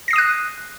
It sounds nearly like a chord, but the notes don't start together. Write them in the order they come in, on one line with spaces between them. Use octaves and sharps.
A#6 C7 D#6 D#7 F#6